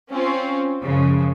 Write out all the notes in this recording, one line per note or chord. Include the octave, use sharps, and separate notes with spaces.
C4 C#4 F4
F#2 C#3 F3 G#3